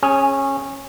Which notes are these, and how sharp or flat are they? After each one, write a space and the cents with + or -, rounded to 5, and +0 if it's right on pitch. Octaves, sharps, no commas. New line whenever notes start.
C#4 -15 G#4 +5